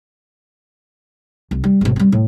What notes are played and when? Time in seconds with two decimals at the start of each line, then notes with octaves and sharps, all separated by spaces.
1.51 C2
1.64 G3
1.81 G#1 B2
1.96 G3 C4
2.12 A2